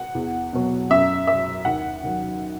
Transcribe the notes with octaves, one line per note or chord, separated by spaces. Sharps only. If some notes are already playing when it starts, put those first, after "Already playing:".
Already playing: F#5
E2
B2 F#3
F#2 E5
F#3 E5
D#2 F#5
D#3 F#3